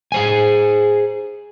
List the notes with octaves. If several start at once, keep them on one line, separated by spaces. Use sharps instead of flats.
G#4 C5 G#5